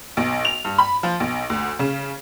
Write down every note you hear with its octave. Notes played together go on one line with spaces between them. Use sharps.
B1
F7
G2
B5
F3
B1
D2
C#3